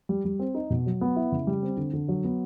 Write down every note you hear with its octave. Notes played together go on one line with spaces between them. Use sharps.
G3
G3
C4
D#4
B2
F#3
B3
E4
C#3
G3
C4
D3
D3
F#3
B3